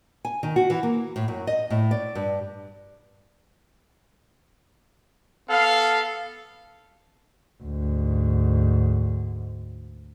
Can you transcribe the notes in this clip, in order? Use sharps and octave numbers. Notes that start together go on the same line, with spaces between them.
G#5
D#3
F#4
E3
A#3
A2
F#2
D#5
A2
D5
G2
B3 A4 F5
D2 G#2